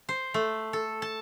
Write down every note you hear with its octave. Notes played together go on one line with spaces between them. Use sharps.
C5
A3
A4
A5